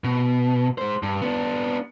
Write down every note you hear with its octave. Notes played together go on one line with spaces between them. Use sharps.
B2
G#3 C5
G2
B3 D4